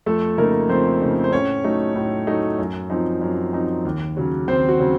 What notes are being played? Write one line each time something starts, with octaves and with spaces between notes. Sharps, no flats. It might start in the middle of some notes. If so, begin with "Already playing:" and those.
F2 A3 A4
C#3 A3 A#3 D#4 A#4
F2 C4 C5
C#3 A3 D#4
C5
A2 C#4 C#5
F#3 A3 D#4
A2
F#3 A3 D#4
F#2
F3 C4 D#4
F#2
F3 C4 D#4
D#2
C#3 F#3
D#2 C4 C5
F#4
C#3 F#3